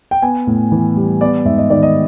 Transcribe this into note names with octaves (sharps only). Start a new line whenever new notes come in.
G5
B3 G#5
A2
E3
G3
B3 D5
G#2 E5
D#5
D#3 D5
D#5